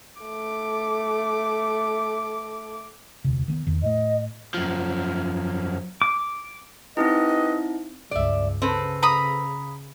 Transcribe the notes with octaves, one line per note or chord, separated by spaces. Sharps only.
A3 D6
E1 D2 C3
D#3 A3 B3
E2 D#3
A2 A3 D#5
F#2 F3
D6
C4 D#4 E4 G4 B4 D#5
C#2 G2 D5 E5
C#3 C4 A4 B4
A#5 B5 D#6